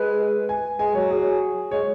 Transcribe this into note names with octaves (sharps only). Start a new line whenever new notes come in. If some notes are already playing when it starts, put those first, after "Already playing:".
Already playing: G#3 B4
G#5
G#3 G#5
F#3 C#5
G#4
G#3 C#5